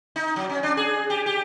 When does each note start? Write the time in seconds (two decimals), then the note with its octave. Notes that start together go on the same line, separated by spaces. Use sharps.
0.16 D#4
0.36 F#3
0.50 C#4
0.63 D4
0.77 G#4
1.10 G4
1.26 G4